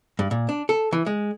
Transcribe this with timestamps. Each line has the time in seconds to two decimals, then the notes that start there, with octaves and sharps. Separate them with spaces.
0.19 G2
0.31 A#2
0.49 D4
0.69 A4
0.92 E3
1.06 G#3